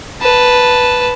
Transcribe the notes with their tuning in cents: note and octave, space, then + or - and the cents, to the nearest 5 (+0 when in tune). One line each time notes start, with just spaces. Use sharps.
B4 +0 A5 +0